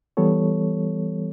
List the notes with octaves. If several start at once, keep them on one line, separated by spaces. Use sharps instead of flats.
E3 G3 B3 A4 C#5